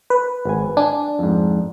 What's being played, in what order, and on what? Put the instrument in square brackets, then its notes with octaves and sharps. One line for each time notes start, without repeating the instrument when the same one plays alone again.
[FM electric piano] B4
[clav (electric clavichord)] G#1 G#5
[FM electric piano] D4 [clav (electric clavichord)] G#5
[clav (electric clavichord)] F2 G#2